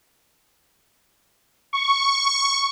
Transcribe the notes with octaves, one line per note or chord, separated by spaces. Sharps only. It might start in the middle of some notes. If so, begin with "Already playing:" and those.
C#6